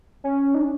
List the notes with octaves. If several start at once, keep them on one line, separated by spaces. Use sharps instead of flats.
C#4
D#4
D4